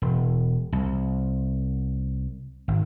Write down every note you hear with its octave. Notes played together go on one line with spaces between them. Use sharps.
E1
C2
G#1